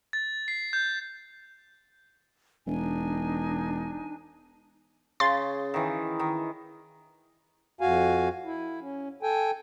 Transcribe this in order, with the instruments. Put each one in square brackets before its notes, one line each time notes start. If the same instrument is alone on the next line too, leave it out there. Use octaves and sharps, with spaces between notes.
[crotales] A6
C7
G6
[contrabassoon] E1 [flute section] D4 D#4 G#5
[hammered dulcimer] C#3 [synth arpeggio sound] C6 A6
[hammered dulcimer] D#3 E3
D#3
[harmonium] F2 F#4 F5 G#5
E4
C#4
A4 G5 G#5